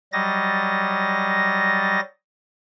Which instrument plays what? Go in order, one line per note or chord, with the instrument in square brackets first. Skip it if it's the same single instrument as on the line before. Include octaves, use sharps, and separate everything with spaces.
[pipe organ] F#3 G3 D#5 A6 A#6